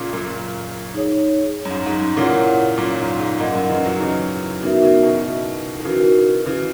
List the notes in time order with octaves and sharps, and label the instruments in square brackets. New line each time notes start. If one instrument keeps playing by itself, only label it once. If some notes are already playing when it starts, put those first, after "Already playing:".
Already playing: [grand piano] A#2 C#3
F#2 A#2
[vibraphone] D#4 G#4 C#5
[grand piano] F#2
G#2
G#2
F#2
[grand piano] A#2 C#3 [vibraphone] E4 A#4 C#5 F#5
[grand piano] F#2 A#2
G#2
G#2
[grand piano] F#2 A#2 [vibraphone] D#4 A#4 D#5 F#5
[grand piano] F#2
C#3 E3
D#3 F#3
C#3 E3
[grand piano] C#3 E3 [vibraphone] B3 D#4 F#4 A#4 E5
[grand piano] C#3 E3
B2 D#3
D#3
[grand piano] C#3 E3 [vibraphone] D#4 F#4 A#4
[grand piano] C#3 E3